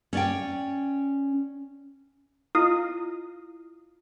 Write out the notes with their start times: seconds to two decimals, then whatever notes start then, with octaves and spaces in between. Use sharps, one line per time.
0.13 C#4 D5 G5
2.55 E4 F4 D#5 F5 D#6